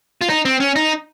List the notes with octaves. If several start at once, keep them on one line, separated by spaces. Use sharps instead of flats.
F4
D#4
C4
C#4
D#4